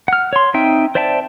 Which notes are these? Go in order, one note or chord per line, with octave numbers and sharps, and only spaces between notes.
F#5 F6
C#5 C6
C4 D#4 E5 G5
C5 D5 E5 G5 A5